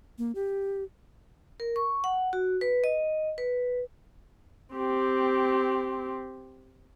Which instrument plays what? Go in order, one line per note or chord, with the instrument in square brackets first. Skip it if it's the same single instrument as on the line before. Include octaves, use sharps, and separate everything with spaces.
[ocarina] A#3
G4
[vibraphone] A#4
C#6
F#5
F#4
B4
D#5
B4
[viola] C4 G4